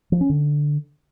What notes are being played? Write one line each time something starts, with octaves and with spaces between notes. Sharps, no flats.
F3
C#4
D3